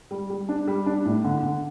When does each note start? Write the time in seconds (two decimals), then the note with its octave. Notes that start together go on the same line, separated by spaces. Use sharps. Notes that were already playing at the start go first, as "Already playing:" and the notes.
0.11 G3
0.30 G3
0.49 D4
0.68 G3
0.86 D4
1.05 A2
1.24 D3
1.43 D3